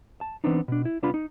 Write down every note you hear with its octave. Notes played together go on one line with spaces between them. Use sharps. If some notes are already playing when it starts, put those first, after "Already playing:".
A5
E3 F3 B3 C4 D4 D#4
B2 D4
E4
C2 B3 D4 F4 B5
D#4